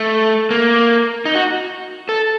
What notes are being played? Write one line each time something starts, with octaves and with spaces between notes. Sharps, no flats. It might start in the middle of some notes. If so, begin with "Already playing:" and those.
Already playing: A3
A#3
D#4
F#4
A4